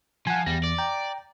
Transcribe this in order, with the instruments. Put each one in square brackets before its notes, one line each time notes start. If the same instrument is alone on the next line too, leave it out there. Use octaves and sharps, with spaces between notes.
[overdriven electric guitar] F3 [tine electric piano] F#5 G#5
[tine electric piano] E2 A#6 [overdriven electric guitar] G3
[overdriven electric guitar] D5
[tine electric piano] G5 A#5